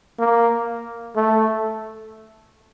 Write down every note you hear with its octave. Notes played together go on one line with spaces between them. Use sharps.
A#3
A3